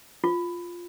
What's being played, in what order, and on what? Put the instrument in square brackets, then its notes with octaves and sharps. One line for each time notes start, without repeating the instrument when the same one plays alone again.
[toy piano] F4